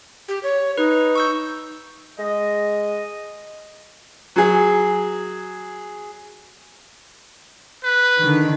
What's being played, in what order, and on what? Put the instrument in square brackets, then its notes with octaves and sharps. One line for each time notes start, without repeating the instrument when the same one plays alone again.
[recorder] G4
C#5
[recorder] D#4 [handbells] B4
[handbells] C#6 E6 G6
[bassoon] G#3 [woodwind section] D#5
[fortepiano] F#3 G#4
[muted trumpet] B4
[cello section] D3 D#3